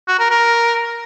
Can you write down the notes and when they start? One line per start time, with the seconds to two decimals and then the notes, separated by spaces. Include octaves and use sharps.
0.08 F#4
0.19 A#4
0.31 A#4